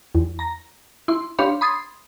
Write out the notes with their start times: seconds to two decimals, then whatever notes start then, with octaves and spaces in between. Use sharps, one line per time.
0.15 E2
0.39 A#5 A#6
1.08 E4 C6
1.38 D4 G4 C#5 F5 B5 C6
1.61 B5 C6 D#6 G#6 A6 C7